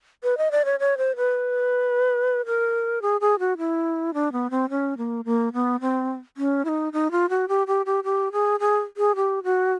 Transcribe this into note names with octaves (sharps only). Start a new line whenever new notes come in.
B4
D#5
D5
C#5
C#5
C5
B4
A#4
G#4
G#4
F#4
E4
D4
B3
C4
C#4
A#3
A#3
B3
C4
C#4
E4
D#4
D#4
F4
F#4
G4
G4
G4
G4
G#4
G#4
G#4
G4
F#4